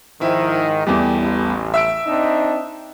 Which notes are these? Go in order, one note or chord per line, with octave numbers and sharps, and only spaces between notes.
G#2 D#3 F3 E4
E2 G3 A3 G4
A1
E5 E6 D7
C4 D4 D#4